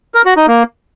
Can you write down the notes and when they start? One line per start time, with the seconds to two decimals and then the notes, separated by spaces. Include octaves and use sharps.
0.14 A#4
0.25 F#4
0.37 D#4
0.48 A#3